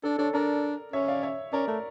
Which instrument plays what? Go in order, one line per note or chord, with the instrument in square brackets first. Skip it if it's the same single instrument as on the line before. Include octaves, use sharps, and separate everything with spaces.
[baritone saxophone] D4 [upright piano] A4
[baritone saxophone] D4 [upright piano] A4 C#5
[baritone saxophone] D4 [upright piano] A#4 D5
[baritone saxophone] C#4 [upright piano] C#5 E5
[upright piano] D5 F5
C#5 E5
[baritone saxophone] C#4 [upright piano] A#4 D5
[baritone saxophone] A3